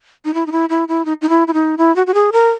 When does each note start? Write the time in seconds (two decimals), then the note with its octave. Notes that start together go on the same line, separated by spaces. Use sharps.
0.25 D#4
0.34 E4
0.46 D#4
0.52 E4
0.69 E4
0.88 E4
1.05 D#4
1.22 D#4
1.29 E4
1.48 E4
1.54 D#4
1.78 E4
1.96 F#4
2.07 F#4
2.14 G#4
2.32 A#4